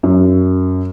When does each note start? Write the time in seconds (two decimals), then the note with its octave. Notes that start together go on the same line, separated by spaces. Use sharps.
0.03 F#2